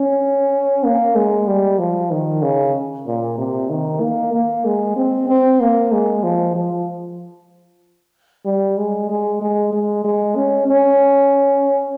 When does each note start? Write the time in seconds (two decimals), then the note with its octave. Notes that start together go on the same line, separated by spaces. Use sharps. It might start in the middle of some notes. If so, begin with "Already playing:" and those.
Already playing: C#4
0.84 A#3
1.15 G#3
1.48 G3
1.79 F3
2.11 D#3
2.43 C#3
3.07 A#2
3.38 C3
3.70 D#3
4.01 A#3
4.33 A#3
4.65 G#3
4.96 C4
5.28 C4
5.61 A#3
5.92 G#3
6.24 F3
6.56 F3
8.45 G3
8.78 G#3
9.09 G#3
9.42 G#3
9.73 G#3
10.04 G#3
10.36 C#4
10.68 C#4